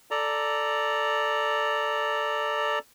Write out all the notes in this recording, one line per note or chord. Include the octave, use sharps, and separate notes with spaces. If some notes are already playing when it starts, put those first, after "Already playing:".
A4 D5 A#5